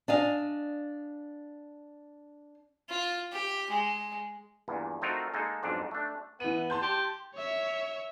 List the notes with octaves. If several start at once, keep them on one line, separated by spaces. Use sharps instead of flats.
D4 D#5 F5 G#5
F4
G4
G#3
E2 G2 A#2
A3 C4 D#4 F4 F#4 A#4
G#3 A#3 D#4 A4
B1 F2 G#2 D4 D5
A3 D4
E3 B3 D#7
A5 C6 G6
G4
C#5 E5